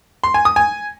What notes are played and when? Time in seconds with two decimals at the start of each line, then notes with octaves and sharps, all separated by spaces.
0.24 C6
0.34 G#5
0.45 D#6
0.56 G#5